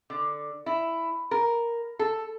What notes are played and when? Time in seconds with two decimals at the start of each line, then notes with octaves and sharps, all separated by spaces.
0.10 D3
0.66 E4
1.31 A#4
1.99 A4